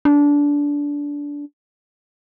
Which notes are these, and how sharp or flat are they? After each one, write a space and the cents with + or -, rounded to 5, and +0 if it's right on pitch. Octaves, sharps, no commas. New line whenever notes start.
D4 -20